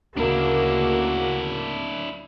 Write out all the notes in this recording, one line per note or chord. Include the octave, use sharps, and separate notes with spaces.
D2 C#3 A#3 D4 E4 F#4